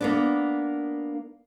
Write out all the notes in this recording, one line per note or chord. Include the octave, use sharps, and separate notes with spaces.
A#3 B3 D4